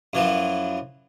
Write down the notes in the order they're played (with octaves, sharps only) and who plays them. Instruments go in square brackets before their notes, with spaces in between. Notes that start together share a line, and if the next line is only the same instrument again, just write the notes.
[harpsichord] F#2 E3 F3